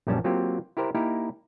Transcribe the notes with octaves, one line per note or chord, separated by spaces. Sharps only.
A#1 F#2 G3 C#4 A5
F#3 A#3 C4 F4 G4
E4 G4 A#4 C5
A#3 D#4 E4 G4 A#4